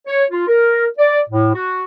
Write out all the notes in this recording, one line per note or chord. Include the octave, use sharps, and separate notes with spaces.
C#5
F4
A#4
D5
A2
F#4